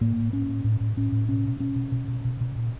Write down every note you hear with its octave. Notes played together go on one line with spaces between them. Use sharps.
A2 A#3
A2
A2 C#4
A2
A2
A2
A2 C#4
A2
B2 C#4
B2
B2 C#4
B2
B2
B2
B2
B2
A#2